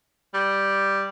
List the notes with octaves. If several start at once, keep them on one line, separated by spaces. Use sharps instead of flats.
G3